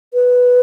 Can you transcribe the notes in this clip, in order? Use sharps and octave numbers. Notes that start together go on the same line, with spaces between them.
B4